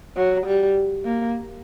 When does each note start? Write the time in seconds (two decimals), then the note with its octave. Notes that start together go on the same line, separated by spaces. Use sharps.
0.16 F#3
0.46 G3
1.05 A#3